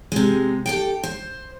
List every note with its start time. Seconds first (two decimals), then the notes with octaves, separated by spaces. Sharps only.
0.12 C3 G#3
0.66 G4 A4 G5
1.03 C5